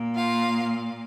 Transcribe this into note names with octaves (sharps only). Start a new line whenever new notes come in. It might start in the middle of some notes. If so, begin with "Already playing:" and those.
Already playing: A#2 A#3
F4 F5